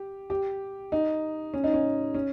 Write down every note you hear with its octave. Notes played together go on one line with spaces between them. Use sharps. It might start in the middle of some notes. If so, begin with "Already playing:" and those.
Already playing: G4
G4
D#4
C#4
D#4
C#4
C#4